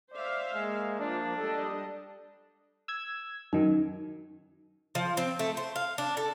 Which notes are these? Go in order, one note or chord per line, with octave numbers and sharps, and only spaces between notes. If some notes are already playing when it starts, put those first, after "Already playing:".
C5 D5 E5 F5
G#3 A#3
F3 D4
G3 A4 D#5
E6 G#6
F#2 D#3 D#4
F3
C4
A3
C5
F5
D4
A4